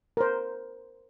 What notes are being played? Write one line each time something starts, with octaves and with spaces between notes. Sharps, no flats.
A#4 C5